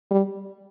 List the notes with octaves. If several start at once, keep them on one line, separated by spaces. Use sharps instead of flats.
G3